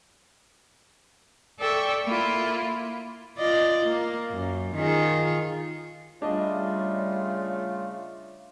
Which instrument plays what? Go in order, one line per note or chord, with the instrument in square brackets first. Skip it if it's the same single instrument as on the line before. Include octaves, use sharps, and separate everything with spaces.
[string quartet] A4 D5 E5 G5 C#6
A#3 E4 F4
[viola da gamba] F4 D5 D#5
A#3
F#2
D#3 F4 G#4
[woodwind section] C#3 A3 [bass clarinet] G3 [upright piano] D4 D#5 [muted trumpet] F4